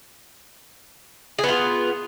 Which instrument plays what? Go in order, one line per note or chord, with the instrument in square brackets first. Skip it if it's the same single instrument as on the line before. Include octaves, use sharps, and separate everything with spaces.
[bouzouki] G#4
B3
F4